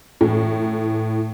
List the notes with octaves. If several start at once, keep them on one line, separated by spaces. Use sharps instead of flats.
A2 E3